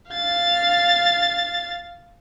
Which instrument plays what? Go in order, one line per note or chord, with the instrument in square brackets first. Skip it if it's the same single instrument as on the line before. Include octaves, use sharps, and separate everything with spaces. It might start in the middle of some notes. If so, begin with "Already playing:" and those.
[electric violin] F5 A6